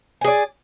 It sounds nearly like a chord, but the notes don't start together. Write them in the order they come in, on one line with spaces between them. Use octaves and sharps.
G#5 G#4 D5